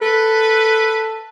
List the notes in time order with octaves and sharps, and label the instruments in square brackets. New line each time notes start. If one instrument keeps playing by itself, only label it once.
[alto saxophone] A4 [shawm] B4